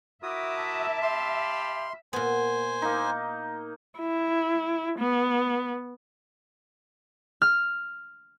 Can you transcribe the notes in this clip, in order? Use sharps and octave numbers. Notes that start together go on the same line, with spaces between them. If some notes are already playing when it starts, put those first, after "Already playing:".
E4 F#4 A#4 E5 D6 D#6
A5
G4 F5 B5 C6
A#2 B3 C5 G#5
A#3 D#4
E4
B3
F6